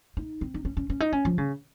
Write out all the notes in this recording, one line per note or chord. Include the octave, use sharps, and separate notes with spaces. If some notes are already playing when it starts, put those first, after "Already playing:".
D#4
C4
D#4
C#4
C#4
C#4
D#4
C#4
F3
C#3